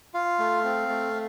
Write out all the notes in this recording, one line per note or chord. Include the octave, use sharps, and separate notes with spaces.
F4 F5
A3
C4
A3